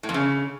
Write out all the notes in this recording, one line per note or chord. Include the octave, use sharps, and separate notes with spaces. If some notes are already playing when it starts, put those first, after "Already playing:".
A2
F2
C#3